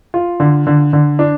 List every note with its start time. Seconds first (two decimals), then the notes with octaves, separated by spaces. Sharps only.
0.14 F4
0.40 D3
0.67 D3
0.93 D3
1.19 D4